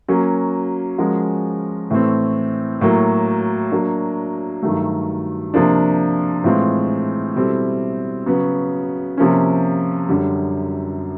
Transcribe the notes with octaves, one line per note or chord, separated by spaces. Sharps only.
F#3 A#3 C#4
F3 G#3 C#4 F#4 A#4
A2 E3 A3 C4
A2 F#3 A#3
F#3 A#3 D4
G2 D#3 F#3 A3
C3 F3 A#3 D4
A2 E3 G#3 C4 F4
B2 G3 C4 E4 A4
C#3 F#3 B3
C3 F3 A#3 C#4
F#2 D3 G3